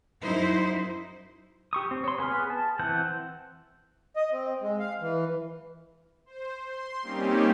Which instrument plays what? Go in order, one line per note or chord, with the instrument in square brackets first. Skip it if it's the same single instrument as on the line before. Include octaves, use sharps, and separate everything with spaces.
[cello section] F#2 D#4 E4 C5
[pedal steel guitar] G4 C#6 D#6
C4
C#5 C6
B3 G#4 B4 F6
A5
E3 C4 F#5 G6
[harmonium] D#5
C4
G#3
F5
E3
[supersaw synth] C5
C6
G3 A#3 C4 C#4 D#4 G4